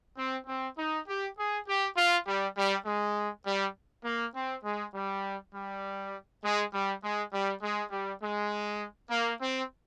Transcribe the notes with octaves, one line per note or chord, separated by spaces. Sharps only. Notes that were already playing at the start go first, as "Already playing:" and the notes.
C4
C4
D#4
G4
G#4
G4
F4
G3
G3
G#3
G3
A#3
C4
G#3
G3
G3
G#3
G3
G#3
G3
G#3
G3
G#3
A#3
C4